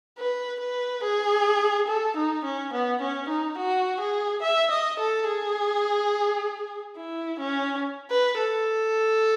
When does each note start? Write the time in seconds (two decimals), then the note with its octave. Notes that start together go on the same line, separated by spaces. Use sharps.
0.18 B4
0.60 B4
1.03 G#4
1.88 A4
2.16 D#4
2.44 C#4
2.73 B3
3.01 C#4
3.29 D#4
3.58 F#4
4.00 G#4
4.42 E5
4.71 D#5
4.99 A4
5.28 G#4
6.96 E4
7.39 C#4
8.10 B4
8.38 A4